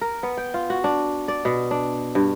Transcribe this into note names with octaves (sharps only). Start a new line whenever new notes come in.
A#4
B3
G5
F4
F#4
D4
D5
B2
D4
G2